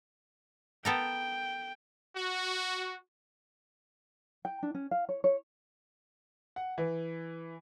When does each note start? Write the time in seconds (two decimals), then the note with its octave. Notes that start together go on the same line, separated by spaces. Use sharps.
0.85 B3 A4 A#4 G5
2.16 F#4
4.45 G5
4.63 D4
4.75 C#4
4.91 F5
5.09 C#5
5.24 C#5
6.56 F#5
6.78 E3